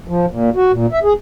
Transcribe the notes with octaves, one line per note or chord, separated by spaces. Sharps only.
F3
A#2
F#4
A#2
E5
G#4